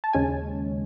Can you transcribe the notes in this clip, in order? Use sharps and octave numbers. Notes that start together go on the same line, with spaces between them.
A5
D#2 C#3 G#3 C#4 G#5